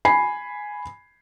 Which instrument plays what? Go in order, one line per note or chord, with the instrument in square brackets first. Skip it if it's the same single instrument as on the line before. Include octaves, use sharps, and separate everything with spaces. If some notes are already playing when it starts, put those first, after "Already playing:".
[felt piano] G#5 B5 C7